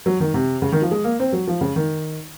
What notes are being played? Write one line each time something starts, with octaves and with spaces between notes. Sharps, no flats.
F#3
D#3
C3
C#3
D#3
F3
G#3
A#3
C4
F#3
F3
C#3
D#3